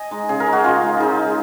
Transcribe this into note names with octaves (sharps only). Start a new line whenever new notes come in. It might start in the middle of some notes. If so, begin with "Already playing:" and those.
Already playing: D#5 G#5
G#3 D#4
C#3 G#4
A#4
G#3 D#4
F#4
C#3 F4
G#3 D#4
C#3 D#4
G#3 D#4